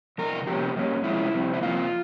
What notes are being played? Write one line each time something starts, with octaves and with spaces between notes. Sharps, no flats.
E2 C3 A#4
C3 F3 A#3 C#4 G4
G2 G3 A#3 C#4
C3 F3 G#3 C#4 E4
F2 C3 G3 C4
E4
F2 C3 F3 A#3 F4